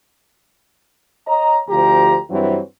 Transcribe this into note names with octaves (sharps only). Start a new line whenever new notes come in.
C#5 D#5 A#5
D2 F3 G4 A#5
G2 E3 F#3 C4